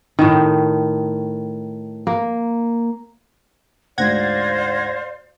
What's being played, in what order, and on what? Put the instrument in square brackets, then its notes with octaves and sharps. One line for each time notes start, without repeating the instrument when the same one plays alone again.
[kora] A2 D#3
A#3
[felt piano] D2 G#2 [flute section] C5 F5 [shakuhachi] D5 [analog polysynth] F#5 G#6 A#6